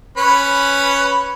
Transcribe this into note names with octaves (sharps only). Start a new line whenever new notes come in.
C#4 B4 B5